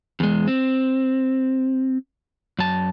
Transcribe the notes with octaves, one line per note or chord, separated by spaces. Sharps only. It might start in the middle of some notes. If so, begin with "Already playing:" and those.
E2 G#3
C4
F#2 A5